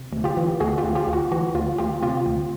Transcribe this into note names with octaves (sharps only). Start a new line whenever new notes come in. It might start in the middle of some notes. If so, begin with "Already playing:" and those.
Already playing: C3
D2
F4 G4
E3
D2 F#4 G#4
F4 G4
D2
F4 G4
D2
F#4
E3 F#4
D2 F4
D2 F4 G4
C3 F4 G4
D2